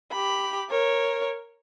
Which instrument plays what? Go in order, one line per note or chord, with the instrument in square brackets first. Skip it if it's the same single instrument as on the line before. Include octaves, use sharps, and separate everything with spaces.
[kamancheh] G4 B5
A#4 C#5